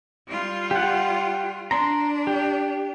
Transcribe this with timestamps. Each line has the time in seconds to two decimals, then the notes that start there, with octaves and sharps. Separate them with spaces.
0.27 G3 F4
0.71 G4 F#5
1.71 D4 A#5 C6
2.27 G4